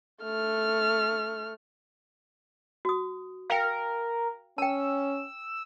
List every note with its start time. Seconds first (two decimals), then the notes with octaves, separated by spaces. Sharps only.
0.23 A3 F6
2.85 F#4 D#6
3.50 A#4 F5 G5
4.58 C#4 G5 A5 E6